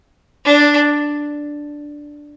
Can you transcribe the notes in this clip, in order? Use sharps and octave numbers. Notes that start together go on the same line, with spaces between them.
D4